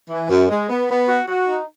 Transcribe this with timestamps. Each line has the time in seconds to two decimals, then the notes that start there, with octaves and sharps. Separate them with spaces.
0.09 E3
0.30 F#2
0.49 G#3
0.69 B3
0.89 B3
1.09 F#4
1.28 F#4
1.48 D#4